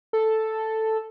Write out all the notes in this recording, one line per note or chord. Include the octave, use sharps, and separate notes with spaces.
A4